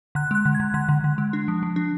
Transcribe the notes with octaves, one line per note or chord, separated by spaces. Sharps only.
D3 F#6
G#3 F#6
D3
G#6
D3
D3 F#6
D3
D3
G#3
D4
F3
F3
D4